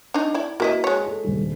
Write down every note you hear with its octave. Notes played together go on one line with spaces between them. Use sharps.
D4 D#4
E4 D5
A#3 E4 F#4 D#5 B6
G#3 C#5
A4
D#1 G2